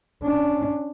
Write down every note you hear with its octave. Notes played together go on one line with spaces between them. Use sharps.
C#4 D4